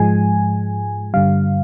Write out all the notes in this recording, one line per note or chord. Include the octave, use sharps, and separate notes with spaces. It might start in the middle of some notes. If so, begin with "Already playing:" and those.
Already playing: G#2 F3 G#3 G#5
G2 D3 G3 F5